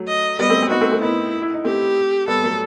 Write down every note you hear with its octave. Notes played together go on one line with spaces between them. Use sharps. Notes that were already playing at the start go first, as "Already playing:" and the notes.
Already playing: F#3 A3
D#5
G3 B3 D#5
A3 C4
C4
B3 D#4 F#4
A3 C4
A3 C4
B3 D#4 E4
E4
D#4
A3 C4 G4
G3 B3 A4
F#3 A3